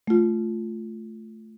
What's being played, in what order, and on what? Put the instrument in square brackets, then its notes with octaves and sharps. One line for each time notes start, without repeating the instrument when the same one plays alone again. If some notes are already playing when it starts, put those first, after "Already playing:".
[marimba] A3 F4